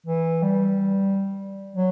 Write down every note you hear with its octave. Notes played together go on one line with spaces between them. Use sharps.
E3
G3
F#3